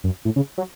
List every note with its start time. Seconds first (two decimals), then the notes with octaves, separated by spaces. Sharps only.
0.04 F#2
0.25 A2
0.36 C#3
0.58 F#3